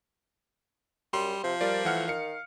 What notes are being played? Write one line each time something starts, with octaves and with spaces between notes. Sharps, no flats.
F#2 G3 C6
C3 F3
G3 F4 A#4 D5
E3 A3 F#5 F6
D#3 F5 C#7